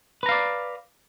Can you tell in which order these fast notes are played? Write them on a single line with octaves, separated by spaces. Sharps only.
B4 A#5 F5 D5